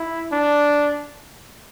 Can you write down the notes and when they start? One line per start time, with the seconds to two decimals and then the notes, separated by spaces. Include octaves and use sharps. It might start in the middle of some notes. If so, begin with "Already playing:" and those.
Already playing: E4
0.32 D4